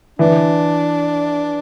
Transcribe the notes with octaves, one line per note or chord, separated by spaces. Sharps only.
E3 D4